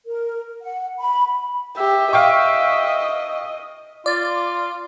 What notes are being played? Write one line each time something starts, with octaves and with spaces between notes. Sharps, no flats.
A#4
F#5
B5
G4 E5
D#5 F5 G5 C#6
F4 D5